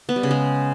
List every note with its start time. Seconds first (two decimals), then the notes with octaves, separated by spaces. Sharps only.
0.09 B3
0.16 G3
0.23 C#3
0.31 G#3